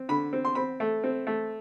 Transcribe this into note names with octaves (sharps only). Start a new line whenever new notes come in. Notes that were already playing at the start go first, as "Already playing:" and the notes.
Already playing: C4
D3 B5
C4
C6
C4 B5
A3
C4
A3